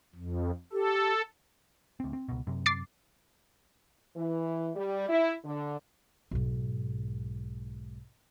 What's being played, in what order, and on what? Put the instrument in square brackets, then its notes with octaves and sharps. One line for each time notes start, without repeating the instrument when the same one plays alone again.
[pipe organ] F2
[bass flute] G4 [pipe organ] A4
[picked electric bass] D2 C4
C4
C#2 B2
F#2 C3
[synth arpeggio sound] D6 A6 C7
[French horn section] E3
G3
E4
D3
[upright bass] B1 G#2